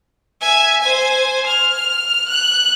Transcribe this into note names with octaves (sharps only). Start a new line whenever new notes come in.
E5 G#5
C5 G#5
F6
F#6